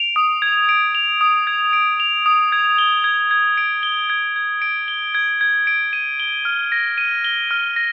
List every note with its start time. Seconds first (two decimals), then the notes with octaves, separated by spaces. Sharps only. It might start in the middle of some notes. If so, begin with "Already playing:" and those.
Already playing: D7 F7
0.16 D#6
0.42 G#6
0.69 D7
0.95 F7
1.21 D#6
1.47 G#6
1.73 D7
2.00 F7
2.26 D#6
2.52 G#6
2.78 G7
3.04 G#6
3.31 G#6
3.57 D7
3.83 G7
4.10 G#6
4.36 G#6
4.62 D7
4.88 G7
5.15 G#6
5.41 G#6
5.67 D7
5.93 D#7
6.20 G7
6.45 F6
6.72 A#6
6.98 D#7
7.24 G7
7.51 F6
7.76 A#6